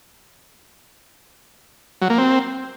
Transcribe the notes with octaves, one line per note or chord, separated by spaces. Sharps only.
F#3
A#3
C4